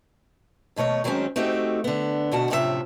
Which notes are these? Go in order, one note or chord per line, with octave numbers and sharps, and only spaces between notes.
D#2 B2 A3 C#5 D#5
D#3 F#3 G#3 C4 C#4
A3 C4 D#4 F#4 G4
D3 B3
D2 B2 F#4 A5
F#2 A2 C3 F3 A#4 E5